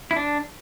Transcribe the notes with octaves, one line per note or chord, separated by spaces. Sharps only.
E4
D4